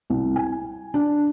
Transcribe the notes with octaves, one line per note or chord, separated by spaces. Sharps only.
C2
G#5
D4